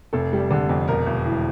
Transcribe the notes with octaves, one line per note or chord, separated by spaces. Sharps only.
F1 A4
G3
D3
F2
E1 A#4
E1
E3